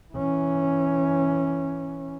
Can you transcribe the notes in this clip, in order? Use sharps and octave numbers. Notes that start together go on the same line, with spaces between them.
E3 C#4